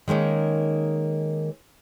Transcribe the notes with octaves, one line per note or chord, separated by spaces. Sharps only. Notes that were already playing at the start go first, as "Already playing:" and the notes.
D#3 G#3 A#3 C#4 D#4